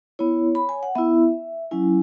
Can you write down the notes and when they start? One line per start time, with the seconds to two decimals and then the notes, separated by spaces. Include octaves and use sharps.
0.19 B3 E4 C#5
0.55 B5
0.69 G#5
0.83 F#5
0.95 B3 E4 E5
1.71 F#3 C#4 E4 G#5